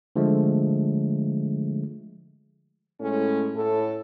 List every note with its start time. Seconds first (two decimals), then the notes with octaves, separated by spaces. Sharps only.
0.16 D3 F3 G#3 A3
3.00 A2 G#3 A3 C#4
3.55 A2 A4